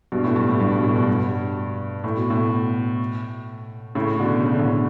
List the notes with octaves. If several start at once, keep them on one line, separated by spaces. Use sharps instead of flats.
G2 B2
A2
G2
A2
G2 B2
G2
B2
A2
G2
G2
A2
B2
A2
A2 C#3
B2 D3
C#3
D3
A2 C#3